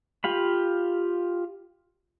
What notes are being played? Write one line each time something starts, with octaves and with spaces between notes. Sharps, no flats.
F4 G4 F5 B5